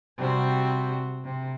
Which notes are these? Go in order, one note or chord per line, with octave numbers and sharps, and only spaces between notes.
C3 G3 C4 F#4
C3